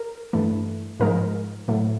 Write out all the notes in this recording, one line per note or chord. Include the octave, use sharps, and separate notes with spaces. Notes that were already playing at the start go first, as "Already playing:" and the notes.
Already playing: A#4
G2 E3 A3
G#2 F3 G#3 A#4
A2 F#3 A3